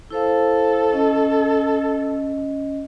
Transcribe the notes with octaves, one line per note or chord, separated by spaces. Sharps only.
E4 A4 C5 F5
C#4 D#5